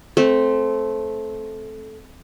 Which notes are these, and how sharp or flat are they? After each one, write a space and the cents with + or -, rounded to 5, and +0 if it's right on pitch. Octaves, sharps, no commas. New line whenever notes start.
A3 -15 C4 +0